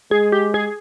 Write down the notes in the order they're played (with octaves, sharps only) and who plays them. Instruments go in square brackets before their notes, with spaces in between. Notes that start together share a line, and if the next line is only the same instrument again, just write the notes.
[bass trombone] G#3 [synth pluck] G#4
[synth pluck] G4
G#4